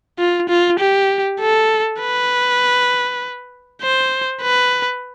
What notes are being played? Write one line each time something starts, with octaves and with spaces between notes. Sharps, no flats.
F4
F4
G4
A4
B4
C5
B4